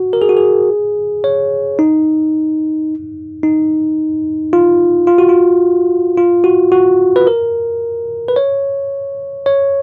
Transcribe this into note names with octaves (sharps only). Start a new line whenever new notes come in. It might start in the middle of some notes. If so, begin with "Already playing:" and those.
Already playing: F#4
A#4
G#4
F#4
G#4
C#5
D#4
D#4
F4
F4
F#4
F4
F4
F#4
F#4
B4
A#4
B4
C#5
C#5